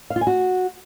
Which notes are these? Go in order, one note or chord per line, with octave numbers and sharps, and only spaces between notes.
F5
F4
G#5
F#4